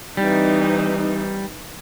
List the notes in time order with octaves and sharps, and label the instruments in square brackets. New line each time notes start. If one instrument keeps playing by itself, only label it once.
[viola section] E3 C4 D#4 [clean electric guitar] G3